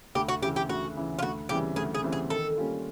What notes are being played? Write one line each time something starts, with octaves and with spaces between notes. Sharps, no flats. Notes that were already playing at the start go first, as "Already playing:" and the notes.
D2 G4
F#4
C#3 E3 G4
G4
D2 F#4
C#3 E3
F4
D2 F#4
C#3 E3 G3 C4 G4
D2 G#4
G#4
C#3 E3 G3 C4
G#4
D#3 A4
G3 A#3 C#4 F4